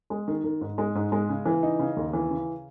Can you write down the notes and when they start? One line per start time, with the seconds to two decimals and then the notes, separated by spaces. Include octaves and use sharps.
0.10 G#3
0.28 D#3
0.44 D#3
0.61 G#2
0.78 G#3
0.95 G#2
1.12 G#3
1.29 C#3
1.45 E3
1.63 D#4
1.79 C#3
1.97 D#2
2.13 E3
2.30 C#3